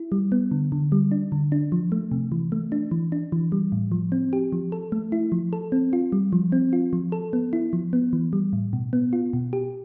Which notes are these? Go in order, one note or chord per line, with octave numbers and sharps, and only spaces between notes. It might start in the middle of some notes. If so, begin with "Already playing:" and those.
Already playing: E4
G3
B3
D3
D3
G3
D4
D3
D4
F3
A3
C3
E3
A3
D4
E3
D4
E3
G3
A2
F3
C4
G4
F3
A4
A3
E4
F3
A4
C4
F4
G3
F3
C4
F4
F3
A4
B3
E4
F3
B3
E3
G3
A2
B2
B3
F4
B2
G4